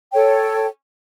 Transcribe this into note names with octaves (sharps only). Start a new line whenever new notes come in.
A4 C#5 G5